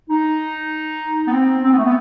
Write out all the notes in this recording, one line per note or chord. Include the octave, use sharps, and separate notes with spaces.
D#4
B3
C4
C4
B3
A3
B3